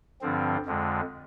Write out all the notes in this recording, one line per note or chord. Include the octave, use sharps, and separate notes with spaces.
G2 D3 F3 C4
F2 D3 G#3